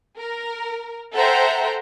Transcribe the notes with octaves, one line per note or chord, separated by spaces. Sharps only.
A#4
A4 C5 E5 F#5 G5 A#5